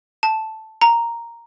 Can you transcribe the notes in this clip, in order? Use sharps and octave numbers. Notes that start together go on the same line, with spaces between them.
A5
A#5